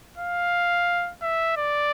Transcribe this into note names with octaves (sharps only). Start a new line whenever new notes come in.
F5
E5
D5